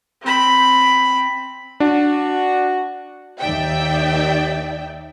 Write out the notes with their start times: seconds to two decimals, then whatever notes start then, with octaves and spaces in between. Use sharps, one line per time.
0.22 C4 B5
1.80 D4 F#4
3.39 D#2 D#4 D5 E5 G5